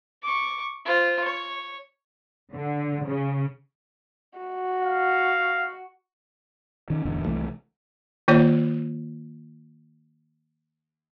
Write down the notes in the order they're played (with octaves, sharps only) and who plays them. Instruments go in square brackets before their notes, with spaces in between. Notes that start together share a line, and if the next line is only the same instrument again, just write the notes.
[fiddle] C#6 D6
F4 C5
C#5
[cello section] D3
C#3
[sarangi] F#4
[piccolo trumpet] F5
[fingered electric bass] D#3 C#4
D1 E2 D3
C2 C3 E3 A3
[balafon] D#3 A#3 F4 C#5 D5